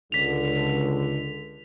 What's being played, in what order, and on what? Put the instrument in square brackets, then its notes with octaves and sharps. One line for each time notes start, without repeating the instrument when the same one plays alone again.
[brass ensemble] C#2 D3 [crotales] B6 F7